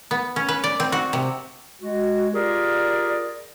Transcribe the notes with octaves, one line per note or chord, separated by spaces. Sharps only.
B3
C#4
B4
D5
C4
F#4
C3
G#3 F#4
F4 G4 G#4 A#4 D5